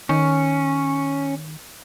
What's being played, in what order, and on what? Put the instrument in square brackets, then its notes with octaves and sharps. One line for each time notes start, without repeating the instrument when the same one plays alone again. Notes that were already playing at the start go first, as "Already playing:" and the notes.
[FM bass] D#3 [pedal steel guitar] C#4